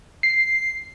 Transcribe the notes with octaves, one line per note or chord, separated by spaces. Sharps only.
C7